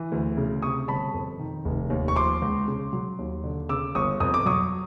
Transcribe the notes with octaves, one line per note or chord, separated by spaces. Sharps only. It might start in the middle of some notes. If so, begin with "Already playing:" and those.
Already playing: E3
D2
C#3
C3 C#6 D#6
G1 A5 B5
F2
D#3
F1
D#2
C#6
F3 C6 D6
C#2
C#3
F#3
D#2
D3
C#3 D6 E6
G1 C#6 D#6
F2 D#6
D6
F#3 C#6 D#6